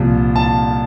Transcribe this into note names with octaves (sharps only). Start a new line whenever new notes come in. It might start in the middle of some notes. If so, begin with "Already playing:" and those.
Already playing: C2 A#2 F3
A5